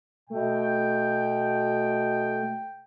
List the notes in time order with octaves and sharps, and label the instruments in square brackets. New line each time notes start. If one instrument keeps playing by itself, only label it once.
[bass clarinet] B2 [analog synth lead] A3 [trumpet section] G5